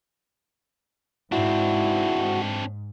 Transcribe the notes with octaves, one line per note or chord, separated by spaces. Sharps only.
G#2 C4 D4 E4 F#4